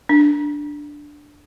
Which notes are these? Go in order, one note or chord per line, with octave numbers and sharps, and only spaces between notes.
D4